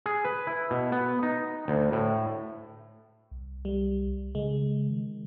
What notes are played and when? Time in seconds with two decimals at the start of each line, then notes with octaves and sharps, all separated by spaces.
0.06 G#4
0.25 B4
0.47 E4
0.71 B2
0.92 B3
1.23 D#4
1.68 D2
1.92 A2
3.31 C2
3.65 G3
4.35 C#3 G#3
4.91 D#3